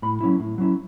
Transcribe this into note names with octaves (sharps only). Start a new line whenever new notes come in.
A2 B5
F#3 C#4 E4
A2
F#3 C#4 E4